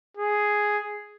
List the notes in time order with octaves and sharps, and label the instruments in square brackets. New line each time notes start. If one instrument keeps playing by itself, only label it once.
[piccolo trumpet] G#4